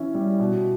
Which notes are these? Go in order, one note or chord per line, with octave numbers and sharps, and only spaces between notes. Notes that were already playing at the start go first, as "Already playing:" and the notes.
Already playing: E3 C#4 E4
G3
B2